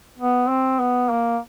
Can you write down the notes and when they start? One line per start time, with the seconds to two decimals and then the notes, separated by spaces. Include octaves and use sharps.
0.18 B3
0.49 C4
0.80 B3
1.11 A#3